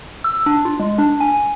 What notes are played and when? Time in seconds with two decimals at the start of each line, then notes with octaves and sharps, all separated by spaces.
0.24 E6
0.46 D4
0.65 F4
0.80 G#3
0.98 D4
1.20 G#5